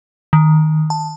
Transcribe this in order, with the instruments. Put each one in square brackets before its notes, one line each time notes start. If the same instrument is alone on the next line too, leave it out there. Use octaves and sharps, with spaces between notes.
[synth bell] D#3
A5